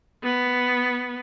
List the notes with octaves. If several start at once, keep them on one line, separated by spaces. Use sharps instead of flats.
B3